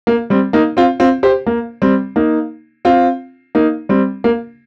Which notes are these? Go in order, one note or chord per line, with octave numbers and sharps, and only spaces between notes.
A#3
G3 C4
A#3 D#4
C4 F4
C4 F4
G4 C5
A#3
G3 C4
A#3 D#4
C4 F4
A#3 D#4
G3 C4
A#3